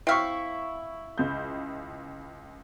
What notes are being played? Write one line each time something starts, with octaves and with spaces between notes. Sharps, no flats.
C4 E4 E5 F5 C#6
C#2 G6